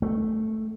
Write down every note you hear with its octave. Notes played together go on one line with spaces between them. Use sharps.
A3